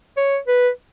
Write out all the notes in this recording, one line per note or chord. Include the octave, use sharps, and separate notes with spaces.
C#5
B4